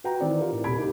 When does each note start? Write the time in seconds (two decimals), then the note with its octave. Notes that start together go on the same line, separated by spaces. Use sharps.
0.04 F#4 B4 F#5 G5 A#5
0.20 D#3 E3 C4 D5
0.40 F4 G4 A#4
0.52 A2
0.64 D#1 C3 G4 B5 G#6 D7
0.77 A#3 D#4 G4